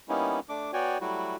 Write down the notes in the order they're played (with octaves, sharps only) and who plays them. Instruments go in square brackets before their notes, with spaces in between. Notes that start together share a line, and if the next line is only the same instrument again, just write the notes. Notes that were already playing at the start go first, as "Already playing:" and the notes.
[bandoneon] G3 A#3 B3 C#4 D#4 E4
A3 D4 D6
B3 F#4 C#5 D5 G5 G#5
F#3 G3 A3 E4 F#4